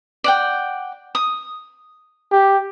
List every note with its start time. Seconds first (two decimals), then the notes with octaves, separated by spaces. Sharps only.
0.24 D5 F#5 G5
1.15 D#6
2.32 G4